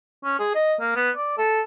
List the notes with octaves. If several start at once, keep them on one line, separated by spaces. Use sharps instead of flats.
C#4
G#4
D#5
A#3
B3
D5
A4